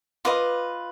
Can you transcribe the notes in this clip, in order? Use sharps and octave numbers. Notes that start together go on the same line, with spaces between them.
F4 B4 D#5 D6